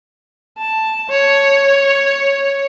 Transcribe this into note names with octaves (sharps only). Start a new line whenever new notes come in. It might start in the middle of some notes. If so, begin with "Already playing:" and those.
A5
C#5